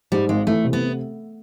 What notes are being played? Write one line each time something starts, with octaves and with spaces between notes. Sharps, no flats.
G#2 G3
G#1 G#3
E3 A3
C3
B3